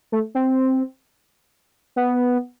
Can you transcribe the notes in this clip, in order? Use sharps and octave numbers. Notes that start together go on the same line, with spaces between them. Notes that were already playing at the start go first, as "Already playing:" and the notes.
A3
C4
B3